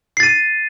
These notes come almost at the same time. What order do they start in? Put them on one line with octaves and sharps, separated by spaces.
C7 A6 D#7